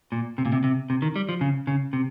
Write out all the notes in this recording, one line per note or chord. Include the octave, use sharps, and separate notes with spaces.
A#2
C3
A#2
C3
C3
C3
D#3
G3
F3
C#3
C#3
C3